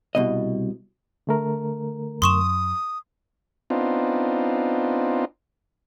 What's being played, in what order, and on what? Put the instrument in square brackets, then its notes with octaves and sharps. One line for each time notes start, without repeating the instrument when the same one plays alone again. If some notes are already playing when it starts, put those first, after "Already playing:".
[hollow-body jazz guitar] C2 B2 D#5
[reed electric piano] D3 A3 A#4
[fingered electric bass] F#2 [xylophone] C6 C#6 E7 [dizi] D#6
[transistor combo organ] B3 C4 D4 D#4 F4